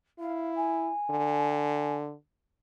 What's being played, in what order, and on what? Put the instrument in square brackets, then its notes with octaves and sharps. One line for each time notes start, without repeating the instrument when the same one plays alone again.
[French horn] E4 [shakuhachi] F5
[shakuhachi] G#5
[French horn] D3